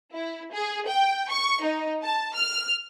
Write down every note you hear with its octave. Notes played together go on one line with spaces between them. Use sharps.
E4
G#4
G5
C#6
D#4
A5
F6